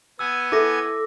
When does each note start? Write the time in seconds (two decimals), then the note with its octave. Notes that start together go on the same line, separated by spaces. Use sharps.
0.19 B3 G#5 E6
0.52 E4 A4 D6 A#6